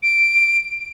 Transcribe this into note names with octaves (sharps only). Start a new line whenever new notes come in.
D7